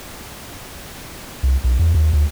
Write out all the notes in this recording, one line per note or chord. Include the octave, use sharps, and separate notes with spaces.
C2
B1
E2
D#2
D2